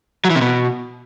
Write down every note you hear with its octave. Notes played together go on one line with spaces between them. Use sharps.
F#3
E3
C3
B2